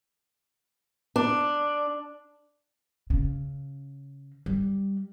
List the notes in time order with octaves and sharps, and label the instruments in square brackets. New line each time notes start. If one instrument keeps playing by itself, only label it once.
[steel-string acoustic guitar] D4
[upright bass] C#3
G3